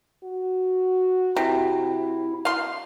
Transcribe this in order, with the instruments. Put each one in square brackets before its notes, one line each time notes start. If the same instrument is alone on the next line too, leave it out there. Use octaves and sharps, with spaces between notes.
[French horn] F#4
[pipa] C3 [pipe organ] E4
[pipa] F5 C6